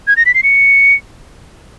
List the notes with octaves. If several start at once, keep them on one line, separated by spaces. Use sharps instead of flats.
G#6
A#6
B6
C7
C#7